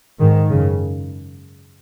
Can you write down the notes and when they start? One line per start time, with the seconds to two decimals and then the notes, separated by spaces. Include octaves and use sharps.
0.19 G#2 D#3
0.49 F#2 C#3